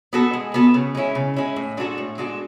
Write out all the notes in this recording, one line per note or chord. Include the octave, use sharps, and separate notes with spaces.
B3 F#4 A4
G#3
B3 F#4 A4
C#3
G#3 C#4 E4
C#3
G#3 C#4 E4
A2
G#3 D4 F#4 A4
A2
G#3 D4 F#4 A4